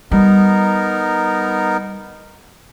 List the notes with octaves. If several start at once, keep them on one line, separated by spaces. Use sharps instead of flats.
G3 B3 D#4 A#4